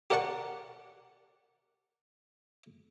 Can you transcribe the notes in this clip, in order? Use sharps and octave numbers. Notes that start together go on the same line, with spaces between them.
G4 A#4 D5 F#5 A5 C#6